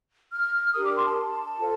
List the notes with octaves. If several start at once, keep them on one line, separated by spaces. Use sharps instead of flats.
F6
D4 G4 A#4 D#6
D6
C6
A5
F4 A4 C5